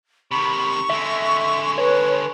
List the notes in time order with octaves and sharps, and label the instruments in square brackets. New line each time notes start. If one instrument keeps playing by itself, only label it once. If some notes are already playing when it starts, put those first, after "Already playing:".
[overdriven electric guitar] C3 D#3 [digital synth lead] B5 [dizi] C#6
[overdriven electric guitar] D3 G#3 [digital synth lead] E5
[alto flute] B4 [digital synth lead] C#5 [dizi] C#6